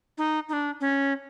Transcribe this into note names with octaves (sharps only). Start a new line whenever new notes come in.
D#4
D#4
D4
C#4